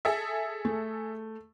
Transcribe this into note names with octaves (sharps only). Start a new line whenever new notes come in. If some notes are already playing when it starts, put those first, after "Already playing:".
G#4 A4 E5
A3